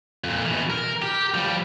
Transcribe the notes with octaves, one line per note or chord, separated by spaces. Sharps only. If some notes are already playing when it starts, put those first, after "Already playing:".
F2 A#2
B2 E3
A#4
G4
F3 G3